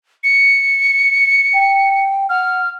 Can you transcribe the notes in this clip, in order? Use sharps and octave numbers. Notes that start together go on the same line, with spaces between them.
C#7
G5
F#5 F6